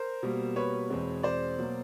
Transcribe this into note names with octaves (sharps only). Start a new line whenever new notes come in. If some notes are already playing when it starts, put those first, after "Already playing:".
Already playing: A#4 C5
B2 G3 A#3
B4 C#5
E2 B2 G#3 C4
C5 D5
B2 F#3 A#3